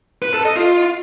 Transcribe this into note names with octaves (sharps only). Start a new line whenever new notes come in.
B4
A4
D#5
F4